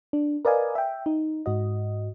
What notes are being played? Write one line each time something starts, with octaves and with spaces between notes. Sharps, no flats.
D4
A#4 B4 D5 D#5 F5 G#5
E5 G5
D#4
G#2 F#4 D#5